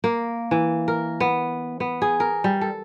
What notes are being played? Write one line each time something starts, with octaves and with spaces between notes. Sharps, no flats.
A#3
E3
A#4
B3
B3
G#4
A#4
G3
A4